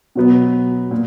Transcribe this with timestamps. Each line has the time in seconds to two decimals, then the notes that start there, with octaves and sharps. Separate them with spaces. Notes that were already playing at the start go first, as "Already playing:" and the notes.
0.15 B2 F#3 B3
0.91 A#2